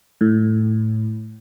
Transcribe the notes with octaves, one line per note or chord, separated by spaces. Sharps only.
A2